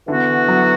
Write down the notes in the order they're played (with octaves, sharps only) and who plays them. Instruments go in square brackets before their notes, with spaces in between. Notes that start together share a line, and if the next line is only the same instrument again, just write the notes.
[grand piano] D3 [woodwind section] E3 B3 F#4
[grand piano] F#3